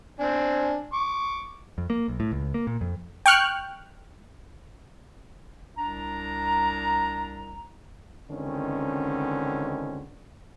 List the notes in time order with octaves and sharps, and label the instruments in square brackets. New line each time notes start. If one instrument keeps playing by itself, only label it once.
[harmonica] C4 D4 G#5
C#6 D6
[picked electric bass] F2
A#3
B1
A2
C#2
A#3
A#2
F2
[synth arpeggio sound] G5 C#6 F6 F#6
[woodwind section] C2 D4 A#5
[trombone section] C#2 D3 D#3 C4 C#4